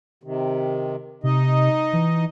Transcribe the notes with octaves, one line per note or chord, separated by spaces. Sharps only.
C3 D#3
C3 D#4 D#5
E3